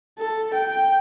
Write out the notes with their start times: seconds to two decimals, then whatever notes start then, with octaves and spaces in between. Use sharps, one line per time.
0.19 A4
0.54 G5